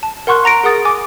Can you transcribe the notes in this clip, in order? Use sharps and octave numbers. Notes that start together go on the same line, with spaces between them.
A5
A#4 F#5 C6 C#6 F#6
F#5 A#5 A#6 D7
G#4 A#4 F#5 D#6 A6
G#5 D6